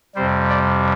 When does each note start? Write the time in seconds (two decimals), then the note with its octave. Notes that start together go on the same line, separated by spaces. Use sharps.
0.15 F2 C3 G3 C5
0.49 D5